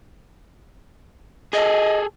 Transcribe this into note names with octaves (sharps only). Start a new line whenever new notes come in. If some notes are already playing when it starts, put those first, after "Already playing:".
G#4 A4 D#5